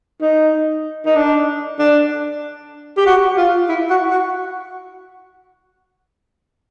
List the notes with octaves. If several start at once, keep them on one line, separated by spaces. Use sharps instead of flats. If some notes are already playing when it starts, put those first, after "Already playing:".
D#4
D#4
D4
D4
G4
F#4
F4
E4
F#4
F#4